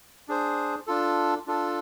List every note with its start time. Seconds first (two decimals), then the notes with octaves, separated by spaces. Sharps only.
0.28 D4 G#4 C5
0.87 D4 F4 A4
1.47 D4 F4 A4